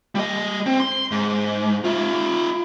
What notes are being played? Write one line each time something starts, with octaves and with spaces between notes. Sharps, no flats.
G3 D#5
C4
C6
G#2
F4 E5